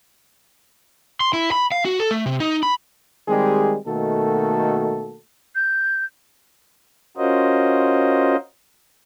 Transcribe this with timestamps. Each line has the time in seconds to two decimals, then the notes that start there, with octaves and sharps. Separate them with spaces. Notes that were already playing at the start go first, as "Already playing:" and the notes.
1.20 C6
1.33 E4
1.52 B5
1.72 F5
1.85 F#4
2.00 A4
2.11 A3
2.26 C3
2.40 D#4
2.63 B5
3.28 D#3 G3 G#3 C4 G4 G#4
3.87 B2 D#3 A3 A#3 F#4 A4
5.55 G6
7.17 C#4 F4 F#4 A#4 C5 D#5